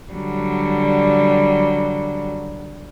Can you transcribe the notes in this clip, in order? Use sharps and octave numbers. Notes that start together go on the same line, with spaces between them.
D3 F#3 G3